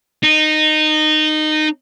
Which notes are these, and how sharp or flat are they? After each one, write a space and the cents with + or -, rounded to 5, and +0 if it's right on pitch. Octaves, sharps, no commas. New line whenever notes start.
D#4 -15